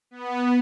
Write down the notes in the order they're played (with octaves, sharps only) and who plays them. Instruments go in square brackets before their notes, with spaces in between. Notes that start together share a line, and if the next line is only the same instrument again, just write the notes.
[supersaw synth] B3